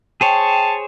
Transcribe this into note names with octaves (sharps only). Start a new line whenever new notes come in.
G#4 C5 C#5 G5 A5